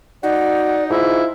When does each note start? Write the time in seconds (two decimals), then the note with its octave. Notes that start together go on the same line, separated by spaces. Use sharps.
0.23 D#4 F#4 D5
0.90 G#2 E4 F4